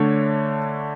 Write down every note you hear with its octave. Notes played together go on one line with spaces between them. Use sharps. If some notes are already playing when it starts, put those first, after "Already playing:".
Already playing: D3 A3 D4 C#5